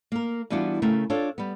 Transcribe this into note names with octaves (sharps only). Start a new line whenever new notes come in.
A#3 A#4
E3 G3 B3 D4 F4 F#4
C#3 A3 A#4
D4 F4 A4 C#5
G3 B3